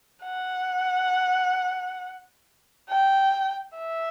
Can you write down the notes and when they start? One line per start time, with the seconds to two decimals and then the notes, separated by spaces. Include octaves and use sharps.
0.24 F#5
2.90 G5
3.78 E5